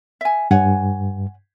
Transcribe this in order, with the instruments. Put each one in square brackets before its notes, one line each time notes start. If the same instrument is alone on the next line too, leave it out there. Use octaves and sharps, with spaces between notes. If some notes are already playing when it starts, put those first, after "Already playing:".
[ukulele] E5 G#5
[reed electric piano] G2 [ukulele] C#5 F#5 G#5